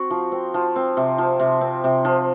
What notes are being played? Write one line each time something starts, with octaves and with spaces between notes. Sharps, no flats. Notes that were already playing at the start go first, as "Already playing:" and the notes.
Already playing: C4 F#4
F3
C4
F3
C4
C3
F3
C3
C4
C3
F3